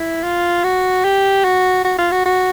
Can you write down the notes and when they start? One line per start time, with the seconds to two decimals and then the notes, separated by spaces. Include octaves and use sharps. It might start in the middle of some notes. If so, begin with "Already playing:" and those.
Already playing: E4
0.23 F4
0.64 F#4
1.04 G4
1.44 F#4
1.85 F#4
1.98 F4
2.12 F#4
2.26 F#4